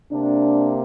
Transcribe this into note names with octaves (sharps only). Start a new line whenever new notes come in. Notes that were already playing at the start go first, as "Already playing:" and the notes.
C3 A#3 D4